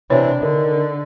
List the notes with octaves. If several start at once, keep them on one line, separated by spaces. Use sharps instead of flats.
C3 E3 D4 C#5
D3 D#3